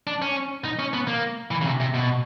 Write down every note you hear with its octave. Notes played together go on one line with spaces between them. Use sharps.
D4
C#4
D#4
C#4
B3
A#3
E3
C#3
C3
C3
B2